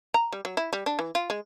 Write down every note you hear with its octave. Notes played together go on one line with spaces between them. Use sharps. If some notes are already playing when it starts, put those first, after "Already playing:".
A#5
G3
F#3
E4
G3
D4
E3
F4
G#3